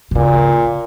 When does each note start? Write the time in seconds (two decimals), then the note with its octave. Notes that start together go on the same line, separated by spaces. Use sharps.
0.11 C3
0.15 A#2 C#3